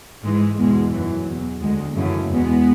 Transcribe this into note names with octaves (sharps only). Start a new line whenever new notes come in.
G#2 E3 G#3
E2 B2 G#3
F#2 E3 F#3
E2 B2
D2 D3 G#3
F#2 C#3 E3 F#3 A3
E2 B2 G#3 B3